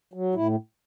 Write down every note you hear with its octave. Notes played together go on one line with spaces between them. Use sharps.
F#3
A2 E4